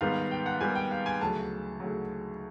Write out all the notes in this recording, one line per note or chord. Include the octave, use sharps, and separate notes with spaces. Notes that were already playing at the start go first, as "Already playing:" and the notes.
G#2 D#3 G3 B3 F5
G5
F#5
G#2 D#3 G3 B3 G#5
G5
F5
G#5
D2 C#3 F#3 A5
D2 C#3 F#3